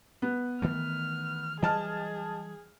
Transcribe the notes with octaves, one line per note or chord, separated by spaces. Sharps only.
B3
D#3 E3 A3 F6
E3 F#3 G3 G#4 D#5 A5 F6